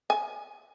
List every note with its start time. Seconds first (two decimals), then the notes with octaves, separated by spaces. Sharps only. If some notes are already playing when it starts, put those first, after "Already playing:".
0.10 G#5